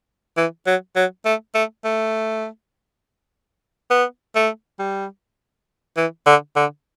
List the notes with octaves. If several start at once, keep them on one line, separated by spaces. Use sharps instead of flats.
E3
F#3
F#3
A3
A3
A3
B3
A3
G3
E3
D3
D3